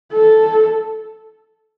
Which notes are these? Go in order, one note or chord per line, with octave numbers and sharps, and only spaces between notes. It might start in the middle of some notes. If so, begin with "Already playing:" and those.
A4